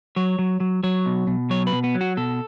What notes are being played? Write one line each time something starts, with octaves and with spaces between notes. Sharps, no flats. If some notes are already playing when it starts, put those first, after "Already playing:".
F#3 C#5
F#3
F#3
F#3 C#5
B2
B2
F#3 C#5
B4
B2
B3
F#3
F#4
B2 A4